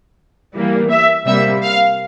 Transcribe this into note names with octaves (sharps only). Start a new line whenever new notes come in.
E3 G3 A#3
E5
C3 G3 A#3 E5
F5